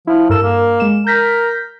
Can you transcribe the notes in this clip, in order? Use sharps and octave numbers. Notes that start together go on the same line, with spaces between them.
F3 E4
G2 A4 A#4 E7
A#3
G#3 E7
A#4 G6 A#6 B6